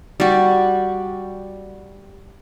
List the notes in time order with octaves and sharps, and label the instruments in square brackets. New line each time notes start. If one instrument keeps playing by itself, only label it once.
[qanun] G3 F#4